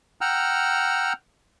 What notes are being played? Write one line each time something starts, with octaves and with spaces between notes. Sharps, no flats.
F#5 G5 A#5 E6 F6